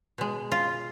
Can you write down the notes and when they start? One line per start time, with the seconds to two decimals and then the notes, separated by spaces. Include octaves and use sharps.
0.18 B2 G#3
0.52 F4